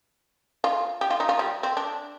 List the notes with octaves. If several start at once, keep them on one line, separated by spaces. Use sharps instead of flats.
F4
G4
F4
D#4
F4
G3
C4
D4